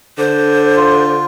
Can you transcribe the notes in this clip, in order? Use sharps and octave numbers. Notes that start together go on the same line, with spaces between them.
D3 C5
F4